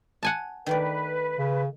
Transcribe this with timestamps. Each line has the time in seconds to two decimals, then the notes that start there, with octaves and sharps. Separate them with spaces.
0.23 F#5 G#5 A5
0.66 D#3 A3 B4 D5
1.38 C#3